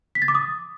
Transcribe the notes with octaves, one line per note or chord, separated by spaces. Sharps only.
B6
A6
D6
D#6